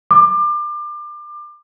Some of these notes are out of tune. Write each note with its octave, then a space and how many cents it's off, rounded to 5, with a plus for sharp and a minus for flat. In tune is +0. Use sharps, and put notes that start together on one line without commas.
D6 +30